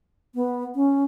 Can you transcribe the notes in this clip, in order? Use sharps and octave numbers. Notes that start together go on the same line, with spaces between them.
B3
C#4